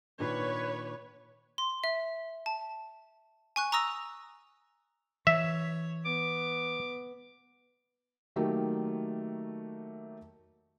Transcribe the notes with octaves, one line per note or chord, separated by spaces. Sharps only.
A#2 D#3 D4 B4 C#5
C6
E5
A5
G#5 C#6 F#6
A#5 C#6 D#6 E6 A#6 F7
E3 C#5 E5
B3 D6
D#3 F#3 A3 A#3 G4